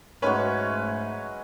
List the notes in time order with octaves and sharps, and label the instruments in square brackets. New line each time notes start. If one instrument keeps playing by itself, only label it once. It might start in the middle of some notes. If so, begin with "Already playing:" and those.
[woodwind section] G#2 A3 [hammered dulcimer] F#3 G#3 C#4 [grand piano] B4 C#5